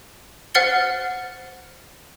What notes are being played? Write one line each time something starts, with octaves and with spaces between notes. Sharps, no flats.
C5 F#5 F6 A6 C#7 G7